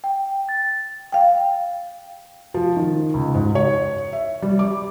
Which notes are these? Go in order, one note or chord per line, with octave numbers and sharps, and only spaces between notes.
G5
A6
F5 G5
F3
D#3
C#2
G#2
C#5
E5
G3
D6